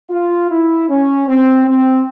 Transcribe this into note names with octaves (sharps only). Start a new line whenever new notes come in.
F4
E4
C#4
C4
C4